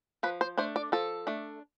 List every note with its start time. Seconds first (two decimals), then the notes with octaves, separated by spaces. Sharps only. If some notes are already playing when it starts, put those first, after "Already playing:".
0.23 F3 B4
0.41 C5
0.58 A3 D4 C5
0.76 D5
0.92 F3 A4
1.27 A3 D4